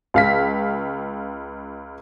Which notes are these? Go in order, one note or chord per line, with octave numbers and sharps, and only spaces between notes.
C#2 F5 B6